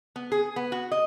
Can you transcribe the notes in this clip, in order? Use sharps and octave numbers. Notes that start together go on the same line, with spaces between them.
B3
G#4
B3
F#4
D#5